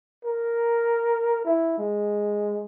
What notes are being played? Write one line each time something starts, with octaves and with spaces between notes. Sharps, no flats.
A#4
E4
G#3